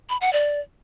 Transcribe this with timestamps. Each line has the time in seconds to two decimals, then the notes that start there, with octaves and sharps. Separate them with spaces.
0.09 B5
0.21 F#5
0.33 D5